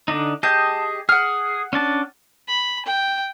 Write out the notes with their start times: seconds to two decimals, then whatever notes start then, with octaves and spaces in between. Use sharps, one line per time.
0.08 D3 D4 D#4
0.43 G4 G#4 D#5 A5 G6
1.09 G#4 F#5 F6
1.73 C#4 D4 A5
2.48 B5
2.85 G5